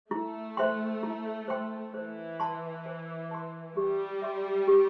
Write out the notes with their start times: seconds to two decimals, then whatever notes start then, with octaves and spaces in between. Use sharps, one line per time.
0.11 A3 E4
0.57 C5 E5 G5 C6
1.03 E4
1.48 C5 E5 G5 C6
1.94 E3 C5
2.40 A5 C6
2.85 C5
3.31 A5 C6
3.76 G3 G4
4.22 E5 C6
4.68 G4